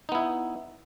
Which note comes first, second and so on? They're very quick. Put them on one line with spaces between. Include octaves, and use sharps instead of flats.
D#4 B3 E4